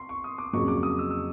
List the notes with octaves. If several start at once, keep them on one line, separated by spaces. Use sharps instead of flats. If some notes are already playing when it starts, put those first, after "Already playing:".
Already playing: C3 C6
C#6
D#6
D6
F2 C#3 F#3 A#3 C#6
D6
D#6
E6
E6